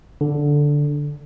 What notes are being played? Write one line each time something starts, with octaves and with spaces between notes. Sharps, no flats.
D3